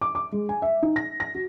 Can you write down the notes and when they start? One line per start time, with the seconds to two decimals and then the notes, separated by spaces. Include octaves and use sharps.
0.01 D6
0.15 D6
0.32 G#3
0.49 G#5
0.62 E5
0.83 D#4
0.96 A#6
1.20 A#6
1.35 F#4